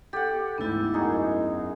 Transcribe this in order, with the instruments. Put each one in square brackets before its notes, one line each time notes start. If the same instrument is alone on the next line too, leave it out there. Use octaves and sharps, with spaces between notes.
[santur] G4 F#5 [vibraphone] A4
[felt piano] D2 G#2 A6 [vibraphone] B3 E4
[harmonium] F#2 [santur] D#4 F#4 G#4